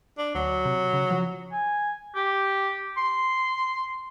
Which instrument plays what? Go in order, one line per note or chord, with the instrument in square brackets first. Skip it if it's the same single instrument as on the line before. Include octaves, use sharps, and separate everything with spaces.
[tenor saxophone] D4
[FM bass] D2 [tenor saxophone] F#3
[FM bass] C3
C#3
F3
[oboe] G#5
G4
C6